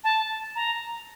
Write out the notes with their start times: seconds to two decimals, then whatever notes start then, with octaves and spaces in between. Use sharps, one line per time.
0.04 A5
0.56 A#5